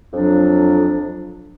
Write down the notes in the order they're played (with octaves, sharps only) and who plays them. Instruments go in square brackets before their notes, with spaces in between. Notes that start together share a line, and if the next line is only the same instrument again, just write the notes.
[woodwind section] F2 F#3 D4